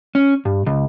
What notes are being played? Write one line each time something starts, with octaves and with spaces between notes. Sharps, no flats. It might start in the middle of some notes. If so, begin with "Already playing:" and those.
C#4
G2
C#2